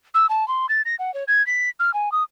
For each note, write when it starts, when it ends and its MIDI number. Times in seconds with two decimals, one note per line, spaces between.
0.15 0.26 88
0.29 0.47 81
0.48 0.66 84
0.69 0.82 93
0.85 0.95 94
0.99 1.14 78
1.14 1.24 73
1.28 1.45 92
1.47 1.69 95
1.80 1.93 89
1.94 2.12 80
2.12 2.23 87